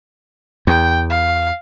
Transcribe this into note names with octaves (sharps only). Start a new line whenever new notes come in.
E2 G5
F5